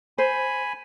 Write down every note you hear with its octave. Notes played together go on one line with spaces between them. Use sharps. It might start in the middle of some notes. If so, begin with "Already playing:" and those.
C5 G#5 B5